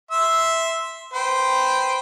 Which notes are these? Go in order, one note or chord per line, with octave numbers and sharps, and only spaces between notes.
E5 C6 E6
B4 C5 G5